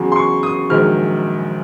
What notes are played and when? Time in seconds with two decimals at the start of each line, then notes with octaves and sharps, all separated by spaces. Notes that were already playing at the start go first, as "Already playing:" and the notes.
Already playing: E2 C#3 F#3
0.12 C6
0.16 C#6
0.43 D#6
0.69 A#1 G#2 D#3 F#3 F6